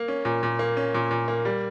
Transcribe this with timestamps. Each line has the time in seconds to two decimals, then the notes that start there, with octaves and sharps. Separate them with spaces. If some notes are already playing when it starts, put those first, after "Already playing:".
Already playing: A#3
0.08 C#4
0.25 A#2
0.43 A#2
0.59 A#3
0.77 C#4
0.94 A#2
1.11 A#2
1.28 A#3
1.45 G3